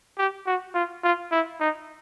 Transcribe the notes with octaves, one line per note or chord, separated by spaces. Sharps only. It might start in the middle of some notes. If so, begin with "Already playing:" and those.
G4
F#4
F4
F4
E4
D#4